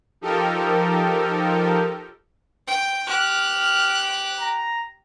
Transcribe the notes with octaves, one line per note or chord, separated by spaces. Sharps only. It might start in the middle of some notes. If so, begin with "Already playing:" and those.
F3 D#4 G4 A4 A#4
G5
G4 F6 F#6
A#5